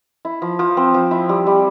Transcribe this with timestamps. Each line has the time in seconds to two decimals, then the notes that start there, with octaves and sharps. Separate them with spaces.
0.25 E4
0.42 F3
0.59 F3
0.77 C4
0.94 F3
1.11 E4
1.29 G3
1.46 G3